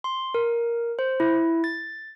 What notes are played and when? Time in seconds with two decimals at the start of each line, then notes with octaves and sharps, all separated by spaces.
0.04 C6
0.34 A#4
0.99 C5
1.20 E4
1.64 A6